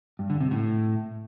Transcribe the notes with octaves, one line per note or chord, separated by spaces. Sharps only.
G2
D3
C3
A2